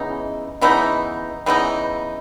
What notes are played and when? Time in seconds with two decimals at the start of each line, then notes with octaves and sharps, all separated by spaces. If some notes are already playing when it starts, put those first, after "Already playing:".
Already playing: C#3 E3 B3 D#4
0.61 C#3 E3 B3 D#4
1.46 C#3 E3 B3 D#4